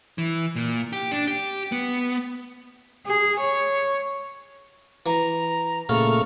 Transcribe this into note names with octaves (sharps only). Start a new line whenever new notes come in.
E3
A#2
G4
D4
G4
B3
G#4
C#5
E3 A#5
A#2 C#3 A3 C#6 F6